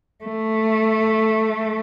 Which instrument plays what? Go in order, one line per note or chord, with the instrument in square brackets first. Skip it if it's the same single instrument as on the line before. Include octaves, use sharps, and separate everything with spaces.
[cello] A3